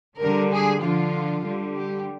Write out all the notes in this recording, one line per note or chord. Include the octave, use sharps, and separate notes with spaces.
D3 G3 A#4
G#4
D3 F3 F4
D3 G3
G4